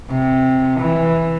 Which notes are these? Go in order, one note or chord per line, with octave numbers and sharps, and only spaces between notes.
C3
E3